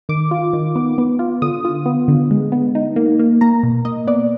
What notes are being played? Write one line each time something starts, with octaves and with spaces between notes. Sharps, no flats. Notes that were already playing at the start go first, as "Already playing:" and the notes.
D#3 D6
F4
D#3
B3
B3
F4
D3 D#6
F4
B3
D3
G#3
B3
D#4
A#3
A#3
A#3 A#5
B2
A#3 D#5
B3 D5